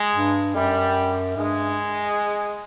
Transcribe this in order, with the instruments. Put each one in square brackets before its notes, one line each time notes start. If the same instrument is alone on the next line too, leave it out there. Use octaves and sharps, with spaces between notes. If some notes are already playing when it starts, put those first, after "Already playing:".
Already playing: [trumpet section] G#3
[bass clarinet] G2
[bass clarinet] F#2 [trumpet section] G3
[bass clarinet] G2 [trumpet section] G#3